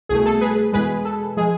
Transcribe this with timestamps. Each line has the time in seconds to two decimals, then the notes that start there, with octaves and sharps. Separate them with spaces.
0.09 C2 B2 A3 G#4
0.26 A4
0.41 G#4 B4
0.73 E2 B2 G#3 G#4 B4
1.05 A4
1.37 F3 G#3 G#4